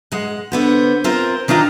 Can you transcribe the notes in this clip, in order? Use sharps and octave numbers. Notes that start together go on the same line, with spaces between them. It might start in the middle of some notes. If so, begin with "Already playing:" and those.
G#3 F#5
D3 B3 C5
C4 F4 A#4 C5
D#3 D4 D#4 F4 A#5